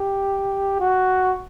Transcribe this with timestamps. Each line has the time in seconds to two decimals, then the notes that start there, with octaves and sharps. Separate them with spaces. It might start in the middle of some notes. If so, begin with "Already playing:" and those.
Already playing: G4
0.80 F#4